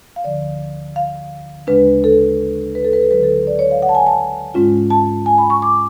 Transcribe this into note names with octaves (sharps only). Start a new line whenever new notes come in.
F5
D2 D3 F3 D5
F5
D2 C#3 G#3 D4 B4
A4
B4
A4
B4
A4
D2 D3 F#3 B4
A4
D5
C#5
F5
F#5
A5
G#5
A5
G#2 G#3 C#4 F4
A5
G#5
B5
C#6
D6